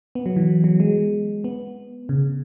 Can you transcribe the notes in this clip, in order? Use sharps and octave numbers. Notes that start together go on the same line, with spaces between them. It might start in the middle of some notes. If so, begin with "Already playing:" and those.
B3
F#3
E3
F#3
G#3
B3
C#3